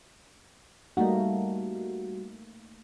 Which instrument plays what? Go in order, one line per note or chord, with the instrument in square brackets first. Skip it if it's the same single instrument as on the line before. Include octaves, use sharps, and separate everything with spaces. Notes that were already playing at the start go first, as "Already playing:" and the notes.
[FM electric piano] G3 F#4 [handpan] A3 A#3 D#4